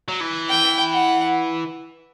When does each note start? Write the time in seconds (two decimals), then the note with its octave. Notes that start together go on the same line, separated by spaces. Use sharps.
0.08 F#3
0.21 E3
0.50 G5
0.93 F#5